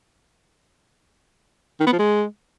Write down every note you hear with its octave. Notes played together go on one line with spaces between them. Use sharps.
D#3
B3
F3
G#3